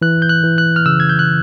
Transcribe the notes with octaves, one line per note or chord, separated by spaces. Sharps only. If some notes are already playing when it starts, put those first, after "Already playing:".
E3 F#6
G6
F#6
E3
F#6
F6
C#3 E6
G#6
G6
F#6